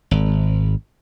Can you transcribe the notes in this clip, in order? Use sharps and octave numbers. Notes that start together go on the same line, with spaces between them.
G#1